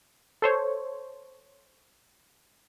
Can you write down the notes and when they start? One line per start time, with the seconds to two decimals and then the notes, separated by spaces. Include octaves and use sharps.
0.42 A4 C5 C#5